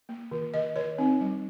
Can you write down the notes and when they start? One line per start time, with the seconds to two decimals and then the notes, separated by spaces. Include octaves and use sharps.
0.09 A#3
0.32 D#3
0.54 D#3 D#5
0.76 D#3 C#5
0.98 C4 D#4
1.21 G3